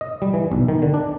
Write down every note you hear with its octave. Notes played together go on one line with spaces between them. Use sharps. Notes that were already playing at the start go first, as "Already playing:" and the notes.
D#5
G3
E3
B1
D#3
D3
D4